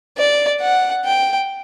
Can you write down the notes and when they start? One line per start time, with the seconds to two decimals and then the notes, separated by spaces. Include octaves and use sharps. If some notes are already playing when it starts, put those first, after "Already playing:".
0.18 D5
0.61 F#5
1.05 G5